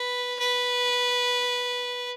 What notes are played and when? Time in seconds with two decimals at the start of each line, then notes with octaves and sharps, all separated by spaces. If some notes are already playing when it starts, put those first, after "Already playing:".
Already playing: B4
0.39 B4